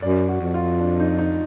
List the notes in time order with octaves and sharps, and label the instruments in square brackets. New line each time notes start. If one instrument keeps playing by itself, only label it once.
[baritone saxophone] F#2 [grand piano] D5
[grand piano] F#4
[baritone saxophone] F2
[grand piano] F4
D4
D#4
D#4